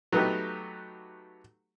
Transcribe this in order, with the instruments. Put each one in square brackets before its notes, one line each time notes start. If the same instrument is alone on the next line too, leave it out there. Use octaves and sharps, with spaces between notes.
[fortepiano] F#3 A3 B3 D#4 G4